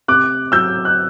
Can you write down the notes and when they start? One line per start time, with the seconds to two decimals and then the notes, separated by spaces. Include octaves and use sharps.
0.08 C3 D6 F#6
0.52 F#3 E6 G6
0.85 F#6